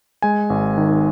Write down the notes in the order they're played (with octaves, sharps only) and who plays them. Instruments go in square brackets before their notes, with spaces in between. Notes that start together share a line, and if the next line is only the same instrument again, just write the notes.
[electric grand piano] G#3 G#5
G#1
D#3